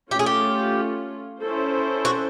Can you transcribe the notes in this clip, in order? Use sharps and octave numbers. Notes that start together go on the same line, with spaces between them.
A3 C#4 F4 G4
G#4
G4
C#4 E4 A4 C5
F#4